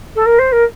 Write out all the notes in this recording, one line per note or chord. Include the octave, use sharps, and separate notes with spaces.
A4
A#4
C5
A#4